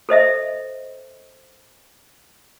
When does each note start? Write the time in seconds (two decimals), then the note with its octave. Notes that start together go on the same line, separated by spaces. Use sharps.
0.09 A4 C5 D#5 E5